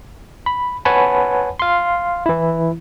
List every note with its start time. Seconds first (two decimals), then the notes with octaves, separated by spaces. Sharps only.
0.46 B5
0.85 B4 C#5 F#5 G#5 A5 B5
1.60 F5 C6
2.26 E3 E4